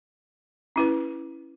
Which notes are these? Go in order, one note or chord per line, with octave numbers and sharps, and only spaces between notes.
C#4 E4 B4